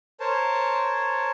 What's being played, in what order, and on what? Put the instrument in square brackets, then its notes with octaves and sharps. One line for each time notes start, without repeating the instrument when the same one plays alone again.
[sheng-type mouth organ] A#4 C5 C#5 A5